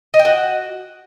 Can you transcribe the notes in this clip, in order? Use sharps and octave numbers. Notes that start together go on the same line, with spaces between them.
D#5
G5
F#4